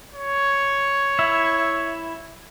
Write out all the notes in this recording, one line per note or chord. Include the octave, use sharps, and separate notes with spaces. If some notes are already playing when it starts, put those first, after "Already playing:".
C#5
E4 E5